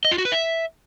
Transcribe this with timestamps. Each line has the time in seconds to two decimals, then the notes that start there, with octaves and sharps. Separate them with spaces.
0.05 D#5
0.11 F4
0.18 F#4
0.25 B4
0.32 E5